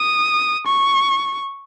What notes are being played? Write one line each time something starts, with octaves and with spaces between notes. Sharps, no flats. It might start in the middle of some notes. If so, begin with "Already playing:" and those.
Already playing: D#6
C#6